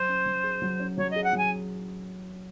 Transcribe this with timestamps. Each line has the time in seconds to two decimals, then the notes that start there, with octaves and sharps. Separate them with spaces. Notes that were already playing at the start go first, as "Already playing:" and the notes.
Already playing: F#3 C5
0.08 C#4
0.26 F#3
0.44 G#4
0.62 F#3
0.79 C#4
0.97 F#3 C#5
1.11 G#4 D#5
1.24 F#5
1.33 F#3
1.38 G#5